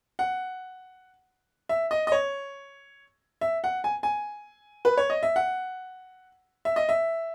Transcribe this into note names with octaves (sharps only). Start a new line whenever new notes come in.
F#5
E5
D#5
D#5
C#5
E5
F#5
G#5
G#5
B4
C#5
D#5
E5
F#5
E5
D#5
E5